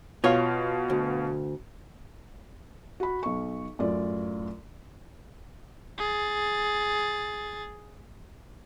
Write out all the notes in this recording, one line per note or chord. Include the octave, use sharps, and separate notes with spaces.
B2 F4 C#5 F5
D2
F#4 B5
B1 C#6
F#2 A2 F4 D5
G#4 A6